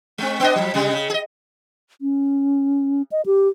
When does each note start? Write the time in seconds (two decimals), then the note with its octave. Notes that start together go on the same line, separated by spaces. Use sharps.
0.18 G#3 C4
0.40 B3 D4 D#5
0.56 F3 F#3
0.74 C3 G3 G#3
0.93 C#3
1.10 G#4 D#5
2.01 C#4
3.12 D#5
3.26 G4